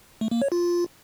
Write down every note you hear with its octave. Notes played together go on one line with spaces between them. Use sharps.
A3
A#3
C#5
F4